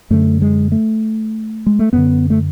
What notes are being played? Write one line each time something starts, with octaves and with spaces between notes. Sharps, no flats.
F#2 D3 A3
G#3
A3
G#3
A3
F#2 D3 B3
A3